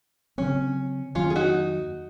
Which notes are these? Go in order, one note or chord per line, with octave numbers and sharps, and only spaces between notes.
C#3 F#3 C4 C#4
F2 D#3 F#3 A#3 C#4 F4
G#4
D#4 F#4